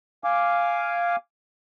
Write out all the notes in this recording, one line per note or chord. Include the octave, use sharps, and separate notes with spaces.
F5 G#5 D6